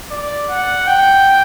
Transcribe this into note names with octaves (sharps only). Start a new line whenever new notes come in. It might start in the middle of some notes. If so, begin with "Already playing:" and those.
D5
F#5
G5